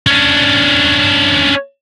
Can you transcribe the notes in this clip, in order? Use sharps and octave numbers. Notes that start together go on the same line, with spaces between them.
C#4 D4